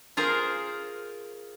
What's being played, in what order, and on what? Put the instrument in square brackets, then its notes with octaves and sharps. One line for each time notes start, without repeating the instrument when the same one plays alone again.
[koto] F4 G#4 A#4 C5